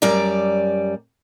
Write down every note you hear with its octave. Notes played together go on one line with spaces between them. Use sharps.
F#2 G3 D5 A#5